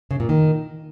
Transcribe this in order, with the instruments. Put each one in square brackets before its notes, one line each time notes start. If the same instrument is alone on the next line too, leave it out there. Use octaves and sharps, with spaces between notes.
[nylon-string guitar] C#3
A#2
D#3